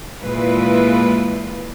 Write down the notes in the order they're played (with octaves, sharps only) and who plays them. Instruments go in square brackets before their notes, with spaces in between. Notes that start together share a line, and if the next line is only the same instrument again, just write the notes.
[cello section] A#2 E3 G#3 E4 F4 B4